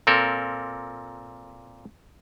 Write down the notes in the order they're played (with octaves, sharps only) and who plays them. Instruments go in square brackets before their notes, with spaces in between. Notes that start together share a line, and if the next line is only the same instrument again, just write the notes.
[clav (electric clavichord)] A#2 C4 A4 A#4